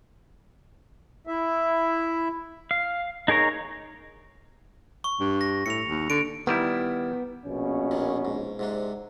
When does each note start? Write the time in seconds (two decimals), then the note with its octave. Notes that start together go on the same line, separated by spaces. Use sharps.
1.27 E4 E5
2.71 F5
3.28 D#4 G#4 A#4 C#5 A#5
5.04 C#6
5.20 G2
5.41 A#6
5.66 A2 C#7 F7
5.89 D#2
6.10 D3 D7
6.47 D#3 G3 B3 E4
7.46 A#1 B2 C#4
7.91 D#2 A#2 D#3
8.25 G#2
8.59 G#2 C3 D4